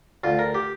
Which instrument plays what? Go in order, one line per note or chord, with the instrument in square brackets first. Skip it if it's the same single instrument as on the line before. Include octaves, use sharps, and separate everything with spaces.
[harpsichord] D2 F4
A#4
G4